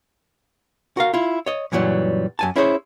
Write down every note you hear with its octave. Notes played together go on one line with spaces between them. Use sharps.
F#4 A#4 F5
E4 F4
C#5 D#5
F#2 A#2 E3 F#3 G3
F#2 G#5 A5
C#4 E4 G#4 A4 C5 C#5